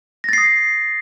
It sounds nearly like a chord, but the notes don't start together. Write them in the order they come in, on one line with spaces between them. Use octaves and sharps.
A#6 A6 C7 D#6